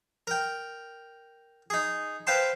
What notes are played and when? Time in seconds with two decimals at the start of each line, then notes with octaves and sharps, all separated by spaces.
0.27 A#4 G5
1.70 D#4 G#4
2.27 B4 C5 F5 G5 A5 C6